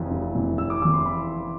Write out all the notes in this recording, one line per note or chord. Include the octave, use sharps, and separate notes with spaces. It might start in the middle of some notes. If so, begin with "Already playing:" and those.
Already playing: F1 F2 E3
F1
F2 E3
F1 E6
D6
F2 E3 D6
C6
B5